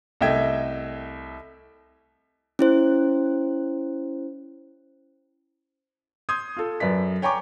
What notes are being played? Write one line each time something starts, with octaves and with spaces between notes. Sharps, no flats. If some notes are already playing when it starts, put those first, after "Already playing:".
C2 A3 D#5 E5 G5 G#6
C#4 E4 C5
C6 D#6 G6 G#6
F4 A4
F#2 B4 D5 B6
C#5 G5 G#5 A#5 C#6 D6